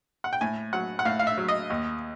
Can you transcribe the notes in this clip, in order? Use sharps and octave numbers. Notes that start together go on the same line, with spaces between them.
F#5
G5
A2 G#5
F#3 F#5
F#5
A2 F5
F5
E5
F#3
D#5
D#2